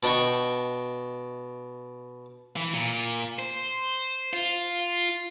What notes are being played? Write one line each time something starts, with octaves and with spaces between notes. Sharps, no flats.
B2 D4 D#5 G5 C#6
E3
A#2
C5
F4